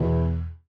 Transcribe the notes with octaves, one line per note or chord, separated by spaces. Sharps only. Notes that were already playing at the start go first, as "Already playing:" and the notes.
Already playing: E2 B2